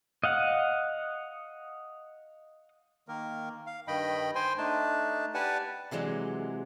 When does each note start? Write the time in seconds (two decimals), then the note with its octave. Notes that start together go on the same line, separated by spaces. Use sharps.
0.24 D#5 F5 F#5
3.08 D#3 A#3 A#4
3.67 F5
3.88 G2 D#3 D#5 G5 B5
4.35 C5 G5 G#5 C6
4.58 A3 D4 D#4 A5
5.34 G4 B4 D5 F#5 G#5 A5
5.91 C3 E3 F#3 G#3